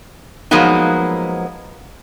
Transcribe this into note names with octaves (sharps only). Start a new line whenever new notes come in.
F3 F#3 G#3 A#3 B3 D#4